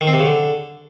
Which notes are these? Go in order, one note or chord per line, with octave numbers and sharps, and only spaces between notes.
D#3
C4
C3
C#3
D3